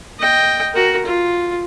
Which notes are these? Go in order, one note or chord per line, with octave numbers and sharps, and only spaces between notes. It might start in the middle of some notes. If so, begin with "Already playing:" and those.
D#5 G5
F#4 A#4
F4